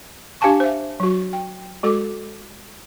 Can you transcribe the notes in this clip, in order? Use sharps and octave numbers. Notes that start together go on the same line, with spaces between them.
D4 G4 F5 G#5 A5 C#6
C5 E5
F#3 F#4
G5
G#3 F#4 A4 D6